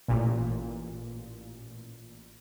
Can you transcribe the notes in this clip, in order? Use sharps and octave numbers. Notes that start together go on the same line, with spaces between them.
A1 A#2